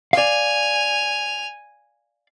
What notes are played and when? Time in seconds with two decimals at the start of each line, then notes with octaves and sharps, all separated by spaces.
0.13 D5 F5 G#5 F7